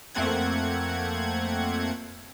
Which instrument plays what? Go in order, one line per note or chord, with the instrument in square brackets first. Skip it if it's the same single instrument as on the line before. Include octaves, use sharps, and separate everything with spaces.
[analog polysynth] F2 A3 A#3 C4 F#5 G#6